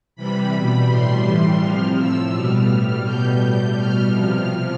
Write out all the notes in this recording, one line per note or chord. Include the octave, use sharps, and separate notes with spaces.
C3 E3 G3 B5
B2 G3
A2 G3 C6
A2 E3 G3
C3 F3 F6
A2 F3 E6
B2 G3 F6
A2 G3 F6
B2 G3 G6
A2 G3
B2 G3 F6
C3 F3